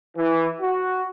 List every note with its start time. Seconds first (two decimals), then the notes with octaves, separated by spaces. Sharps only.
0.17 E3
0.60 F#4